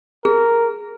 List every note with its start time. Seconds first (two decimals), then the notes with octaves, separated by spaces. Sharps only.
0.25 G#4 A#4